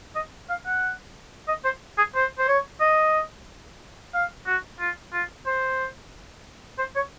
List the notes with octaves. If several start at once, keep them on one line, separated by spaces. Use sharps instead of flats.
D#5
F5
F#5
D#5
C5
G#4
C5
C5
C#5
D#5
F5
F#4
F4
F4
C5
C5
C#5